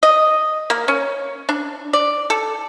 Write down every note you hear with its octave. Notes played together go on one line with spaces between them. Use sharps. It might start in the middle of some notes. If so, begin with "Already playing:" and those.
D#5
A#3
C#4
D4
D5
A4